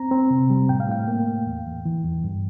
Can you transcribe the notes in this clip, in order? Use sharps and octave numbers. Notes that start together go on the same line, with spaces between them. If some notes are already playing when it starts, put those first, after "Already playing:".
Already playing: C4 A#5
C4
C3
G3
A2 G5
F5
A2 G5
A#3
A2
E2
E2
E3
E2
G2